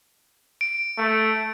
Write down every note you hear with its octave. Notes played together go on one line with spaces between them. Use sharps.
D7
A3